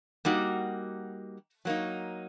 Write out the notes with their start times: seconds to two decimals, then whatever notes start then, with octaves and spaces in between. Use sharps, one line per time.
0.25 G3 A#3 D#4 F#4
1.65 F#3 A#3 D#4